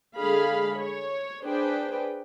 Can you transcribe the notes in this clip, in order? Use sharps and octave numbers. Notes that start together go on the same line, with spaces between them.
D3 G#3 G#4 F5 B5
C#5
D4 G#4 B4 C5 G5